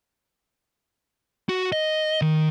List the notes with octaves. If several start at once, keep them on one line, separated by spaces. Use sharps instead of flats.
F#4
D#5
D#3